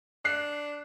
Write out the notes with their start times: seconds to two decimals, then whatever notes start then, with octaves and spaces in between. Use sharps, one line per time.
0.25 D4 F#6 C7